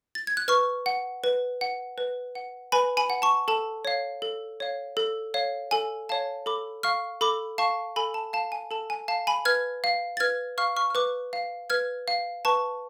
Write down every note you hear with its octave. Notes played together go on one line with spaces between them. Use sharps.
A6
G#6
F#6
B4 C#6 F6
F#5
B4
F#5
B4
F#5
B4 G#5 B5
G#5 B5
F#5
A5 C#6
A4 A5
C#5 F5
A4
C#5 F5
A4
C#5 F5
A4 G#5
C#5 F5 A5
A4 B5 D6
F5 C#6 F6
A4 B5 D6
F5 A5 C#6
A4 G#5 B5
A5
F5 A5
G#5
A4 A5
G#5
F5 A5
G#5 B5
B4 F6 G#6
F5
A6
B4 F6 G#6
F5 C#6 F6
C#6 F6
F6
B4 D6 F#6
F5
B4 F6 G#6
F5
B4 A5 C#6